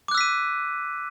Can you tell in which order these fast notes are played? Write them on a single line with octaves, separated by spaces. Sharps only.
D6 F#6 E6 B6 D#7